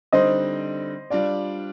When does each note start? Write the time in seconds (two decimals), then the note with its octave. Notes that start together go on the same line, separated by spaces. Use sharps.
0.13 D3 G3 C4 D#4 C5 D#5
1.10 G3 D4 F4 D5